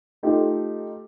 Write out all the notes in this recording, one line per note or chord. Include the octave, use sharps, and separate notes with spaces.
A3 D#4 F4 G4 A4